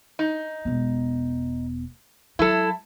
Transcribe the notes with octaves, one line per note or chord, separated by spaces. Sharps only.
D#4
E1 B3
F#3 E4 A4